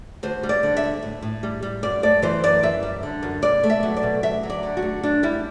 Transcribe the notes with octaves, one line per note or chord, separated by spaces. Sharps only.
D2 C5
G3
D5
D3
E5
D2
A2
A2
G3
G3
F#2 D5
A3 D5
E3 C5
F#2 D5
F#2 E5
G3
D3
F#2
B2 D5
A3
E5
F#3
D5
B2
D2 E5
F#3
D5
D3
F#4
A3
F#2 D4
G3 E4